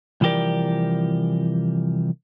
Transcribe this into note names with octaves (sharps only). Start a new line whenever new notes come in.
C2 E3 F3 G4 A#4 D5